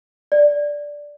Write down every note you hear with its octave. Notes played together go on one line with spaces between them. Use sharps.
D5